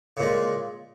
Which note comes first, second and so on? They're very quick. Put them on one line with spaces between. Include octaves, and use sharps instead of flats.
C#3 A#2 G#3